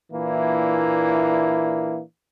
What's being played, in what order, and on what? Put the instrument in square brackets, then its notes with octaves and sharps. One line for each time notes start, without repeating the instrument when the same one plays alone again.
[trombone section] A#2 E3 A#3 D4 E4